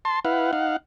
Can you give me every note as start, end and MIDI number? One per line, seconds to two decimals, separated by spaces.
0.05 0.20 81
0.05 0.20 84
0.25 0.51 64
0.25 0.51 71
0.25 0.51 77
0.25 0.51 78
0.53 0.77 63
0.53 0.77 77
0.53 0.77 78